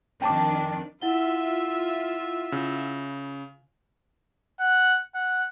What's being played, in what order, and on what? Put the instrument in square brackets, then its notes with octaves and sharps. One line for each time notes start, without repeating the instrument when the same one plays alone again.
[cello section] F2 D#3 D4 [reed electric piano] G5 A5 D6
[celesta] E4 F#5 G7 [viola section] F4 E5
[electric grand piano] C#3
[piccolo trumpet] F#5
F#5